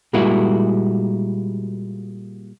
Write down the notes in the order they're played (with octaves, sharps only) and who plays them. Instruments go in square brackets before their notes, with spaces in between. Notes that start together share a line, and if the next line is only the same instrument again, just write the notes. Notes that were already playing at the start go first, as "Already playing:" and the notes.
[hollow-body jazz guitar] A#2 G3 G#3 A#3 E4 F#4